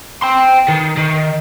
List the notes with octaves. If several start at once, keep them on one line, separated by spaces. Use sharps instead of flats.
G5 C6
D#3
D#3